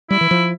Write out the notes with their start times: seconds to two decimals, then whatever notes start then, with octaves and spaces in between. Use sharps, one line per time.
0.10 G3 E4
0.21 E3
0.31 F3